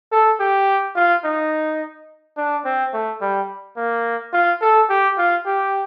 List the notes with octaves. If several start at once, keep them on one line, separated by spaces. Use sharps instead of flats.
A4
G4
F4
D#4
D4
C4
A3
G3
A#3
F4
A4
G4
F4
G4